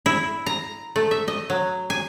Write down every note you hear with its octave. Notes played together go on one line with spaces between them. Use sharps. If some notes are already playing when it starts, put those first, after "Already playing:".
E4
A#5
A3
E5
D#5
F#3
G#5